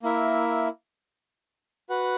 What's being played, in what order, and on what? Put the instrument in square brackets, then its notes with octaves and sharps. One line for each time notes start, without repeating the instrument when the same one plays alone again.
[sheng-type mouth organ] A#3 E4 A#4 E5
F#4 B4 F#5